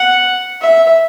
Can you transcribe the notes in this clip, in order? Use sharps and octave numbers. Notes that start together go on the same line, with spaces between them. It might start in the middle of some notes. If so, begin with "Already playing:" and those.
Already playing: F#5
E5